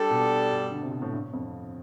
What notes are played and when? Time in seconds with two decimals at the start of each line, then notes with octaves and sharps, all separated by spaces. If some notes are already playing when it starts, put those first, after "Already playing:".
Already playing: G3 D4 A4
0.10 B2
0.51 G2
0.71 D3
0.81 C3
0.91 B2
1.02 A2
1.13 G2
1.33 F2